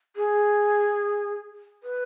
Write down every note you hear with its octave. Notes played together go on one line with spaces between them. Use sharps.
G#4
B4